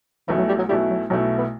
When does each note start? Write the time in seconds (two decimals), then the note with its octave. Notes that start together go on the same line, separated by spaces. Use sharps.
0.28 B1 B2 E3 A3 E4
0.38 F#3
0.48 G3
0.58 F#3
0.69 B1 B2 G3 A3 E4
0.90 F#3
1.10 B1 B2 F#3 A3 E4
1.38 B3